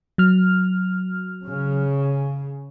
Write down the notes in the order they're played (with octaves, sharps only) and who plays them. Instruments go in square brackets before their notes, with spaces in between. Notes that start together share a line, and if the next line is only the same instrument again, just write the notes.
[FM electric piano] F#3 F6
[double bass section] C#3